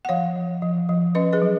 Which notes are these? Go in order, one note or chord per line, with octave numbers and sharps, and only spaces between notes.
F#5
F3 C#5 F5
F3
F3
F3
C#4 B4 D#5
G#4 B4
F#3